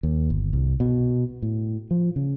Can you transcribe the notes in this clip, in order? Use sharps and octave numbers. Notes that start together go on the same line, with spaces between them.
D#2
G1
C2
B2
A2
F3
C#3